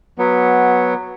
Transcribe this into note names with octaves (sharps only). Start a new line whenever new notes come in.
F#3 B3